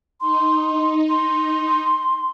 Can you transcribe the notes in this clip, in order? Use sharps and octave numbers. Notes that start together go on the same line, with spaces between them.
D#4 C6
C6